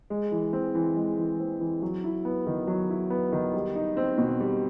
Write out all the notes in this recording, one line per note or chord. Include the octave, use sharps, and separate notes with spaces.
G#3
E3
C4
E3
G#3
E3
C4
E3
F#3
E4
B3
D#3
F#3
E4
B3
D#3
G3
D#4
C4
B2
G3